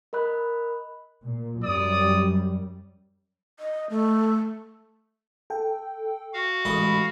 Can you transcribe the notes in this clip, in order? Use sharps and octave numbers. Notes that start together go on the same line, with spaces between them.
A#4 D#5 B5 F#6
A#2
F#2 G3 D5 D#6
D#5
A3
A4 G5
F#4 F5
A1 G#2 D#5 B5